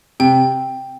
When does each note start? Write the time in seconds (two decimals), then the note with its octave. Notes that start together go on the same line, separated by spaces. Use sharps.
0.20 C3 G5